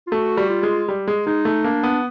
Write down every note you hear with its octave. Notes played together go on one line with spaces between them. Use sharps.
F4
A3 F#4
G3
F4
G#3
G3
G#3
G#3 D#4
A3
A#3 D4
B3